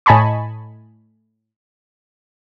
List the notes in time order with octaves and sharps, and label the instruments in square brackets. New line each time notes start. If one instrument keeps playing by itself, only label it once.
[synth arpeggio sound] A2 D#5 G#5 A5 B5 C#6